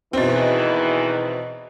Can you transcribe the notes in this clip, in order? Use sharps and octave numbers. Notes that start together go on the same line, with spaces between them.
E2 B2 D#3 E3 C4